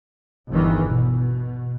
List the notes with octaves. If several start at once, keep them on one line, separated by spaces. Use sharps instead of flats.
G1 E2 D#3 E3
B2